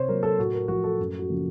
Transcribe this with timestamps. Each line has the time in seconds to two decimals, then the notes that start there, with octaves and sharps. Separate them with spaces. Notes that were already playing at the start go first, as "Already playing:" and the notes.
Already playing: C3 C5 C#5
0.08 F#3 A#3 A#4
0.23 A4
0.38 A2 F#4
0.54 A#4
0.68 F3 A3 F#4
0.84 A4
1.00 F#2
1.19 F#4
1.29 C#3 F3 A#3